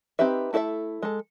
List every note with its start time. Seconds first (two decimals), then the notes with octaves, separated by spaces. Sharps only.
0.19 C4 D#4 G4 B4 E5
0.53 A3 E4 A4 C5 E5
1.03 G#3 A4